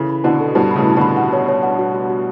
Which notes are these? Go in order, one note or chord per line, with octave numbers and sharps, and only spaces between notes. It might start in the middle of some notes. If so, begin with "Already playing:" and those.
Already playing: C#3 E3 E4 A4
B5
B2 D3 E4
A4
G2 B2 E4
A2 C#3 B5
E4
B2 D3 B5
F#5
C#5
C#5
F#5
F#4
F#4
F#4